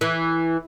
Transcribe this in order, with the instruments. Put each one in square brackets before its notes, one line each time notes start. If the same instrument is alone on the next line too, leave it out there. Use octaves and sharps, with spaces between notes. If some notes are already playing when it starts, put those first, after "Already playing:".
[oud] E3